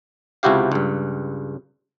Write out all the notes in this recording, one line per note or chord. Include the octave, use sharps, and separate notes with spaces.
C#2 C3 E4 F#4 G4 F5
C#2 G2